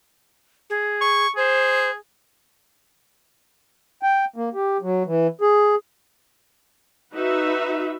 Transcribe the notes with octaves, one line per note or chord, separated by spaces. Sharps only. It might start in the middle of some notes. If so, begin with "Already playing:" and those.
G#4
C#6
G#4 C5
G5
A#3
G4
F#3
E3
G#4
D#4 F#4 B4 E5